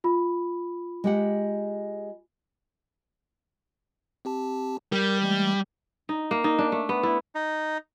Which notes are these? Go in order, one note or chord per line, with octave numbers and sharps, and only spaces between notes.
F4 B5
G#3 G4 F#5
C4 G4 A5
G3 A#4
E3 G#3 A3
D#4
A#3
D#4
D4
A3
B3
E4
D#4